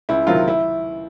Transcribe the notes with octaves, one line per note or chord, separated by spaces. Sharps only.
C#2 E4
C3 D#3 F#3 F4
E4